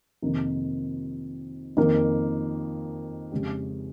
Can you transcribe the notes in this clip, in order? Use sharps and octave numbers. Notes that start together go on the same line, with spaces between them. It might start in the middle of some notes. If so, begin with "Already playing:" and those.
F2 C3 D#3 A#3 D#4
F2 D#3 A#3
F2 C#3 G#3 C#4 G4